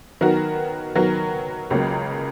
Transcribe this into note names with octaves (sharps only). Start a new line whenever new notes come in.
D#3 F#3 B3 F#4 A#4
D#3 F#3 B3 F#4 A#4
C#2 C#3 F#3 A#3